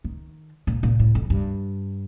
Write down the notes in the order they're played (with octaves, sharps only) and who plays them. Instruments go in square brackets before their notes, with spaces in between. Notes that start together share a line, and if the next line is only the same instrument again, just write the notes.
[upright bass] D#3
A#2
A#2
A2
F2
G2